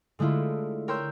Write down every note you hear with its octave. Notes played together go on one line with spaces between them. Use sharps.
D3 G#3 A3 E4 F4
A#4 C#5 G5 C6 E6 G6